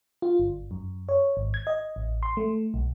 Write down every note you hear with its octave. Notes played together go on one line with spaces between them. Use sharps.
F4
G1
F#2
C#5
G#1
G#6
D#5
A1
C6
A3
B1